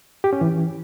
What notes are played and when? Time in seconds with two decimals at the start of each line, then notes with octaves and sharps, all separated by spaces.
0.24 G4
0.33 C#4
0.41 E3